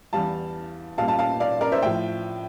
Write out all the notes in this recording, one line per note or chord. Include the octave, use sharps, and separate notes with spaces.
E2 E3 G3 F5 A5
A#2 G3 F5 A5
F5 A5
F5 A5
D5 F5
A#4 D5
C5 E5
A2 F3 E5 G5